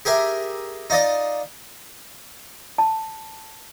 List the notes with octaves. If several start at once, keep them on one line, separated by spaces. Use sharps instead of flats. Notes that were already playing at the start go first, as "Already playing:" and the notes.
G4 G#4 A#4 E5
D#4 F4 D5 D#5
A5